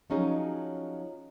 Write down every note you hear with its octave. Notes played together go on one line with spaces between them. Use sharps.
F3 F#3 C#4 D#4 G#4